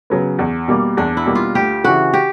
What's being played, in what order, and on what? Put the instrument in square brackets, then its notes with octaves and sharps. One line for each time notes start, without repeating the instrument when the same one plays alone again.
[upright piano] C#3 F#3 B3
E2
B2 G3 A#3
[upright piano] E2 [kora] D4
[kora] E4
[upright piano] B2 G3 A#3
[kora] F4
[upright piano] D2 [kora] G4
[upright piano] C#3 E3 [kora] F#4
[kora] G4